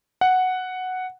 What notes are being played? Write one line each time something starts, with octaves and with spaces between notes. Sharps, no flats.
F#5